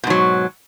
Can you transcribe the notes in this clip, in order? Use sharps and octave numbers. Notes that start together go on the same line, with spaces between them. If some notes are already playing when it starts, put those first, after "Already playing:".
G#2 B2 F#3